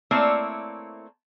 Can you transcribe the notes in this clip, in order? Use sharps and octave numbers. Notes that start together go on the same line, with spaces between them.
A3 A#3 C4 E4 C#5 D5